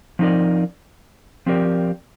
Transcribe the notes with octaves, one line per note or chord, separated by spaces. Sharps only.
F3 C4 D#4 A#4 D5
F3 C4 G4 A#4 D5